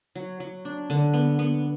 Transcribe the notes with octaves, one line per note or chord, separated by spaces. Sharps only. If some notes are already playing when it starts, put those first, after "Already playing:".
F#3
F#3
D4
D3
B3
B3